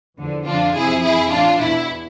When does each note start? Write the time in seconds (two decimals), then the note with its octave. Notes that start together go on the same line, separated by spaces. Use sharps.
0.18 E2 D3 F3
0.46 F2 D3 F3 D4 F4
0.74 F2 C3 F3 E4 G#4
1.03 F2 E3 E4 G#4
1.31 A2 E3 D4 F4
1.61 E2 B2 E4